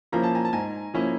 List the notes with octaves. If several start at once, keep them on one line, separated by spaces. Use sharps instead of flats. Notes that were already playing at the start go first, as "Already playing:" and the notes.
F3 A#3 C#4 E4 A#5
A5
G#5 A#5
A5
G#2 G#5 A#5
F3 A#3 C#4 E4